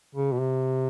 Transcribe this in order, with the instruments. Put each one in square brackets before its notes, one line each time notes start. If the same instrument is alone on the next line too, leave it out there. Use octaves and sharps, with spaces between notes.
[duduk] C#3
B2
C3